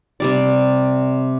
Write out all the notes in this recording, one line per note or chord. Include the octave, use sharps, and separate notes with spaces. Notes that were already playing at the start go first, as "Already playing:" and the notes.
C3 G3 D5